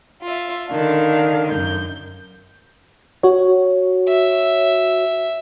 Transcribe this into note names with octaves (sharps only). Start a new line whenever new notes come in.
F4 E5
D3 D#3 D4 F5
F#2 G6
F#4 C#5
E5